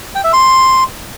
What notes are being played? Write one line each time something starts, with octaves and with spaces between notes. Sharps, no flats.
G5
E5
C6